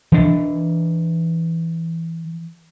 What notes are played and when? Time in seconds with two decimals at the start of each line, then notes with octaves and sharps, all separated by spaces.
0.12 E3 D4